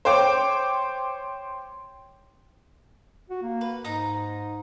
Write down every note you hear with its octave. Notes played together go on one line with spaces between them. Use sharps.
C5 C#5 G5 D6
F#4
A#3
B4
G#2 D#4 A#5